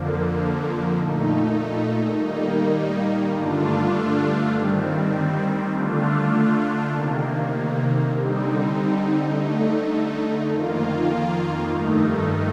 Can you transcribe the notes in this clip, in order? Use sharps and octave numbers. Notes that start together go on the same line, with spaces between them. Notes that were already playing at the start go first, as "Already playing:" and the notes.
Already playing: F2 D3 F3 A#3
A#2 A3 D#4
D#3 G3 A#3 D#4
G2 D3 A3 D4 F4
D#3 G3 C4
D3 A3 D4 F4
C3 D#3 A#3
D3 G3 C4 D#4
D3 A3 D#4
F2 D#3 A#3 F4
G2 D#3 A3 D#4